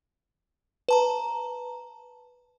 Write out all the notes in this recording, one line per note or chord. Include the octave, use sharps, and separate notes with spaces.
B4 A5 A#5